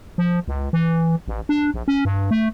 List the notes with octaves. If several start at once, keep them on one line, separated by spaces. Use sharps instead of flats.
F3
C#2
E3
A1
D4
A#1
C#4
G2
A3